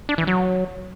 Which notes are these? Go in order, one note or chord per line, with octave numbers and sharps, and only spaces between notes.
D4
E3
F#3